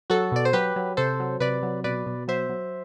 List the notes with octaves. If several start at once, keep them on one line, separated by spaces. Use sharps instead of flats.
F#3 F#4 A4
B2 D5
C5
F#3 G4 B4
F#3
C3 A4 C5
F#3
C3 B4 D5
F#3
B2 B4 D5
B2
F#3 C5 E5
F#3